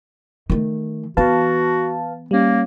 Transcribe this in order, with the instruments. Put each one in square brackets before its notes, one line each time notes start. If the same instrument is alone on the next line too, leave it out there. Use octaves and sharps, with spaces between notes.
[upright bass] D#3 A3
[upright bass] E3 B3 [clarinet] F#4 [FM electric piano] B4 F5 A5
[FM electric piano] G3 C#4 [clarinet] A#3